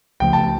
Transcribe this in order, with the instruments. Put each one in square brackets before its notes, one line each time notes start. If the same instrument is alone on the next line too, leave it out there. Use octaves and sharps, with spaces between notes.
[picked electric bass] C#2 C#3 F3 A3 [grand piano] G5
[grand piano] A5